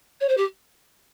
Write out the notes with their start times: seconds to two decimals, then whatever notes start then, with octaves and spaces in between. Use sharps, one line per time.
0.20 C#5
0.29 C5
0.37 G4